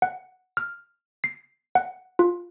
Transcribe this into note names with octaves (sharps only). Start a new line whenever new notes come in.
F#5
F6
C7
F#5
F4